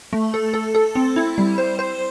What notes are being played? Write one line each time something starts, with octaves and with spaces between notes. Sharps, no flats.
A3
A4
A4
A4
C4
E4
G3
C5
C5